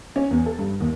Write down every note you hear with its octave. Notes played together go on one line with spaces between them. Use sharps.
C#4
E2
A4
G2
D#2